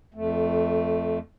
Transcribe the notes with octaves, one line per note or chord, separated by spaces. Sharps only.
F2 A3